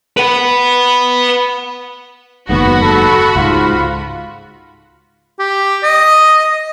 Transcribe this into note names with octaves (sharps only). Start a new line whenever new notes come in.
B4 F#5
F#1 D#2 G#2 B3 F#4 B5
A4
C#2 G#2 F4
G4
D#5